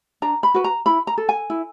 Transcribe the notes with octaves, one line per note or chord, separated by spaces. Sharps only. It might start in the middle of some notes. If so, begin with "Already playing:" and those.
D4 A#5
B5
F#4 B4
A#5
E4 B5
A#5
A4
G#5
E4